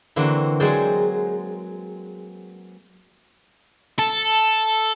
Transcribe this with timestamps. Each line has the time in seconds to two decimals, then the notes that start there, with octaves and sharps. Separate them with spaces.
0.16 D3 E3 A#3 C4 F#4
0.60 F#3 G#3 G#4 C5 D5 G5
3.99 A4